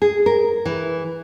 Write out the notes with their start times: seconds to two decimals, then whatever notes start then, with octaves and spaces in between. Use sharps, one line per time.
0.02 G#4
0.26 A#4
0.65 E3